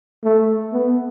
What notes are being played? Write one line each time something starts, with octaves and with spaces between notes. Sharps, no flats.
A3
B3